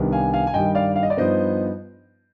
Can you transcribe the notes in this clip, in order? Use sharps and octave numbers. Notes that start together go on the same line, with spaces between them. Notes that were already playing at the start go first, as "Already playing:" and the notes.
Already playing: C2 C3 D#3 B3 D4
F5 G#5
F5 G#5
G#5
G2 D#3 G3 D#5 G5
D5 F5
F5
D#5
D5
G2 F3 B3 D#4 C5 D#5